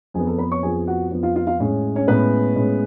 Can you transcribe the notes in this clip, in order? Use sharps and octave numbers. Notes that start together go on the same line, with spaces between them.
F2 F3 B3 G#4 G#5
A4 A5
B4 B5
C#5 C#6
F2 F3 B3 G#4 G#5
F#4 F#5
F2 F3 B3
F4 F5
F4 F5
F4 F5
A2 G#3 C#4
C#4 C#5
A2 G#3 B3 C#4 B4
A2 G#3 C#4